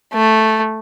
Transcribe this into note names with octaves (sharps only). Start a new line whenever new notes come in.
A3